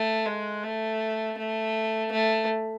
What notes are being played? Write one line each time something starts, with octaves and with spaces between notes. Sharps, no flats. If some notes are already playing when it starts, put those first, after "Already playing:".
Already playing: A3
G#3
A3
A3
A3